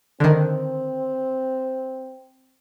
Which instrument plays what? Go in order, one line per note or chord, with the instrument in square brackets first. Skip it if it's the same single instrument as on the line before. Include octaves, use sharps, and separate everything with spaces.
[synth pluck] D3 D#3 [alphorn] C4